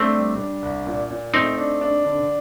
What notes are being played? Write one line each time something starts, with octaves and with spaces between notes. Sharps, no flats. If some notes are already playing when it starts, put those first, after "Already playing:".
Already playing: A3 C4 D4
G3
D4
C2
A#2
A#2
A3 C4 D#4
D4
D4
D3